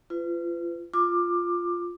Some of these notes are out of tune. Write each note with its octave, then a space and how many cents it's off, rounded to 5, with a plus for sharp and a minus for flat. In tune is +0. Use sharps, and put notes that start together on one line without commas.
F4 -30 B4 +35
F4 +0 D6 +15